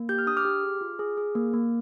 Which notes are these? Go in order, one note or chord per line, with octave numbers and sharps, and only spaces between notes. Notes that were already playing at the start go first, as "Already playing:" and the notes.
Already playing: A#3
G4 G6
F6
D4 D#6
D6 F6
G4
G#4
F4
G#4
G#4
A#3
A#3